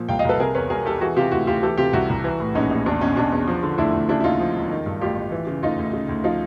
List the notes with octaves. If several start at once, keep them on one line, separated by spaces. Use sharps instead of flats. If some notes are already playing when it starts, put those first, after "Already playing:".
Already playing: A#2 F3
C2 F5 G5
D#5 F5
C2 A4 B4
C3 G#4 A#4
E2 B4 C#5
E1 G#4 A#4
E1 G4 A4
E3 F#4 G#4
C3 F4 G4
D2 E4 F#4
D2 F4 G4
E3 G4 A4
C3 F4 G4
C2 E4 F#4
C2
E3
A2
A#1 C#4 D#4
A#1
E2 D4
B2 C#4
B2 D4
E2
F3
D3
D2 D4 E4
D2
C#3 D4 E4
E4
D#2 D#4 F4
F3
E1
D#3
G2
A1 F4 G4
A1
E3
C#3
D2 D#4 F4
D2
C#3
D2
F3 D#4 F4